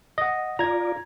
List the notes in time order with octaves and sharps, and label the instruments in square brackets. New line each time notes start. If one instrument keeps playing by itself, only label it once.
[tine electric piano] D#5 F#5
[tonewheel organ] F4 D5 [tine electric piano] A#5 G#6